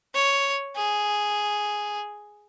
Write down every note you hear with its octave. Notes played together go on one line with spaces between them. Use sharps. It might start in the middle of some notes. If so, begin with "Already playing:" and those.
C#5
G#4